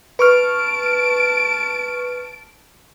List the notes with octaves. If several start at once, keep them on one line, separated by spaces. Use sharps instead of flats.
B4 A5 C#6 F6 D7